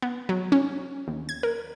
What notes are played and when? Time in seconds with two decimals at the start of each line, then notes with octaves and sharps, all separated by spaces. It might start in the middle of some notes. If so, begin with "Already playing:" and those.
0.02 B3
0.29 F#3
0.52 C#4
1.08 D#2
1.29 G#6
1.43 A#4